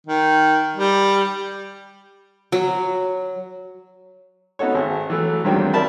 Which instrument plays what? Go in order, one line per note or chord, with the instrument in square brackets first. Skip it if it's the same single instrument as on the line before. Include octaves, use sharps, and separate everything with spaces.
[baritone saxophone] D#3
G3
[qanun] F#3
[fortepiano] B3 D#4 F#4 A4 C#5
G#1
E3 F#3 A3
E2 G2 D#3 F#3 C4
A#4 D5 E5 A5 B5